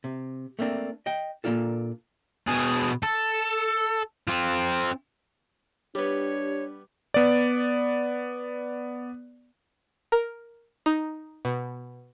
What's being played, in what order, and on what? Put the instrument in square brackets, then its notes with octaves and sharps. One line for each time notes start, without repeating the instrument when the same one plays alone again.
[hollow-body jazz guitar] C3
A3 A#3 C4 D4
D#5 G5
A#2 A#3 D4 F4 A4
[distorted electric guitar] B2 G#4
A4
C4 F4
[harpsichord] G3 B3 [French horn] D4 [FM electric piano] G4 [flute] C#5
[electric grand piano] B3 D5
[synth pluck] A#4
D#4
B2